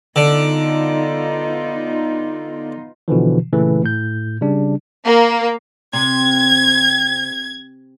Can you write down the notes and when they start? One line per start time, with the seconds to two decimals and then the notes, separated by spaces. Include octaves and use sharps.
0.16 D3 B3 D#4 F4
3.08 B2 D3 E3 F3
3.53 A#2 C#3 E3 A3
3.84 A2 G6
4.42 C#3 G3 D4
5.05 A#3
5.93 C3 G#6